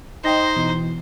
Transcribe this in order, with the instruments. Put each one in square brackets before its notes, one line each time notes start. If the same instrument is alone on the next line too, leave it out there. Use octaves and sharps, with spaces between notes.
[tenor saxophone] D#4 [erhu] C5 [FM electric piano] D#5 G5 A#6
[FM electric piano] B2 E3